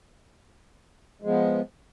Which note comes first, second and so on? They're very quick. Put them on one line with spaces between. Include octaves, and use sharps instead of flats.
G#3 F3 B3